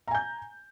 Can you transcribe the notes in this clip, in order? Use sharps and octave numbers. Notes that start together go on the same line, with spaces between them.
G#5 A#5 G6